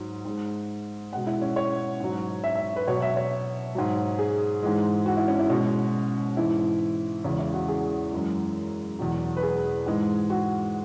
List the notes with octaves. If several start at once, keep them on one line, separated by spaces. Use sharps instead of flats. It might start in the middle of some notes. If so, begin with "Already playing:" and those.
Already playing: G#2 F#3
G#2 G#3
B2 G#3 F#5
E4
C#4
C#5
G#2 F#3
E5
E5
B4
B2 F#3 C#5
E5
C#5
G#2 F#3
G#4
G#2 E3 G#3
F#4
E4
C#4
E4
B2 G#3 C#4
G#2 E3 G#3 E4
E2 C#3 E3 G#3 C#4
E4
F#4
G#4
F#2 E3 G#3
E2 B2 F#3
B4
G#4
G#2 E3 G#3
F#4